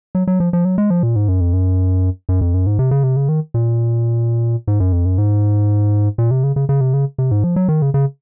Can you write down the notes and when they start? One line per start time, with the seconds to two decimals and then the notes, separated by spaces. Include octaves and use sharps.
0.15 F#3
0.27 F#3
0.40 F3
0.53 F3
0.65 F#3
0.78 G#3
0.90 F3
1.03 A#2
1.16 G#2
1.28 F#2
1.41 F2
1.53 F#2
2.29 F#2
2.41 F2
2.54 F#2
2.66 G#2
2.79 C3
2.91 C#3
3.03 C3
3.16 C#3
3.29 D#3
3.54 A#2
4.67 G#2
4.80 F#2
4.92 F2
5.05 F#2
5.18 G#2
6.18 A#2
6.31 C3
6.43 C#3
6.56 C#3
6.69 C#3
6.81 C3
6.94 C#3
7.18 C3
7.31 G#2
7.44 F3
7.56 F#3
7.68 D#3
7.82 C#3
7.94 C#3